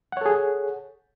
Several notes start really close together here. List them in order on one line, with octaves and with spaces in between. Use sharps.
F#5 C#5 A4 G#4